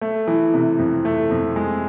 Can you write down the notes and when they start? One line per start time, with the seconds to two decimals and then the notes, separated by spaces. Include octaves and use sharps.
0.02 A3
0.27 E3
0.54 C3
0.79 F2
1.05 A3
1.31 F2
1.56 G#3